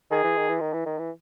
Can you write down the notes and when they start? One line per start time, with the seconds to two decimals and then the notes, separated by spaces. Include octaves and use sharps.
0.11 D#3 G#4
0.24 E3
0.37 D#3
0.49 E3
0.61 D#3
0.73 E3
0.86 D#3
0.99 E3